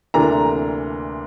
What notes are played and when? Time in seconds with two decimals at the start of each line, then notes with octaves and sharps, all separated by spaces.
0.14 D2 C3 E3 A#3 D4 A#5